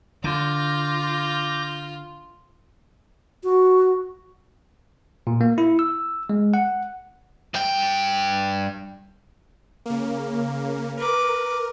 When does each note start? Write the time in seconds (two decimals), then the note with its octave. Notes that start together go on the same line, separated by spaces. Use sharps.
0.24 D3 F4 D6 G6 A#6
3.44 F#4
5.27 A#2
5.41 A#3
5.58 E4
5.79 E6
6.30 G#3
6.54 F#5
7.54 G2 G5
9.86 C#3 A#3
10.97 A#4 B4 D6